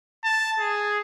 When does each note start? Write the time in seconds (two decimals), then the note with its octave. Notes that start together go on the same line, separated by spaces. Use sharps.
0.24 A5
0.59 G#4